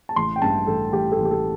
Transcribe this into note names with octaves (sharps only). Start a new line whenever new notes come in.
A5
A1 C6
G5
G2 A5
A1 A4
A1 G4
A4
A1
G4
A4